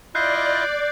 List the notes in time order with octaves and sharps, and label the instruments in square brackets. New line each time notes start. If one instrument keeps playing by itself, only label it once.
[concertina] E4 F4 D#5 [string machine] D5 [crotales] F#6 G6 C7